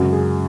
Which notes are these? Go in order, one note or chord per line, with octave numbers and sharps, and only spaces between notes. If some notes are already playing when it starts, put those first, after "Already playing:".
Already playing: F#2 C#3 G#3 F#4
G#4